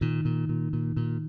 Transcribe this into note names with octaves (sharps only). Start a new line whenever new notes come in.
A#2 D#3
A#2
A#2
A#2
A#2